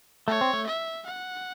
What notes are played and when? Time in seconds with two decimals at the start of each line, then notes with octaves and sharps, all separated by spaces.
0.28 A3 C#5
0.41 C4
0.53 A3
0.67 E5
1.06 F#5